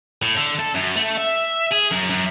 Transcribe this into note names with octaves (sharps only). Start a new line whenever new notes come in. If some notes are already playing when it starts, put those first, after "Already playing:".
A2
D3
A4
F#2
A3
E5
G#4
F#2
F#2